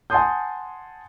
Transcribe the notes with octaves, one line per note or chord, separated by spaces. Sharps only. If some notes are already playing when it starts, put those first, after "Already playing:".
F#5 G#5 A5 C6 D#6 G6